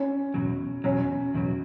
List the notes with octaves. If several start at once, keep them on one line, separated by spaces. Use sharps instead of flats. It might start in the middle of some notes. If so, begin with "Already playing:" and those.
Already playing: C#4
E2 B2 F#3
E2 B2 F#3 C#4
E2 B2 F#3